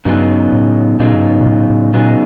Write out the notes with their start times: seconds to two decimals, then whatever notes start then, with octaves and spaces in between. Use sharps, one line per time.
0.05 G2 C#3 F#3 B3 D#4 G#4
0.53 A2
1.00 A#2 C#3 F#3 B3 D#4 G#4
1.14 G2
1.23 G#2
1.41 A#2
1.47 A2
1.70 A2
1.93 A#2 C#3 F#3 B3 D#4 G#4